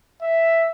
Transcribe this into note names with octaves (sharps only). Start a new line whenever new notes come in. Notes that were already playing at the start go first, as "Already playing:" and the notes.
E5